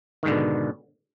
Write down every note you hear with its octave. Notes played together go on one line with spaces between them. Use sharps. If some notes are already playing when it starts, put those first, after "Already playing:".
G#2 B2 D3 D#3